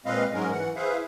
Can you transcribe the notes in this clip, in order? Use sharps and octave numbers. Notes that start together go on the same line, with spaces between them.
A#2 G#3 C4 B4 D#5 F5
G#2 F#3 G#3 C#4 A#4
E3 F#5
E4 G#4 B4 C5 E5 F5